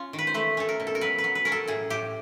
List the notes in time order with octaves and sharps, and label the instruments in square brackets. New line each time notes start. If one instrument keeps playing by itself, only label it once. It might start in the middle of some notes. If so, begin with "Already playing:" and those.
Already playing: [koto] C#4 F4
D#3
B4
C5
A3 B4
C#4 A4
A#4
B2
A4
A#4
F#3 B4
B4
F#3
B4
C#4 A#4
A4
A2 G#4
A2 G4